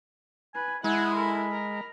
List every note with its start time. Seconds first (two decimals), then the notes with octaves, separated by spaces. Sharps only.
0.55 B4 G#5
0.84 G#3 E4 F#5 G#5
1.15 A4 A#4 B5
1.52 A#4 A#5